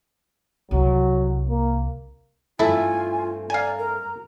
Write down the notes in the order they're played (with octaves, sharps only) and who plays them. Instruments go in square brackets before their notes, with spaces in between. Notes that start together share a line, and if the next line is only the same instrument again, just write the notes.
[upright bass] C2 [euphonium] F#3
[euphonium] A#3
[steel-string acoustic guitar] G2 A3 C4 [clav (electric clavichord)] E4 A4 E5 [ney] F4 [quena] G#5
[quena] D5 [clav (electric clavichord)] F5 G#5 [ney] A#5
[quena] A#4